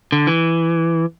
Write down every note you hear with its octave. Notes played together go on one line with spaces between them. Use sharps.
D3
E3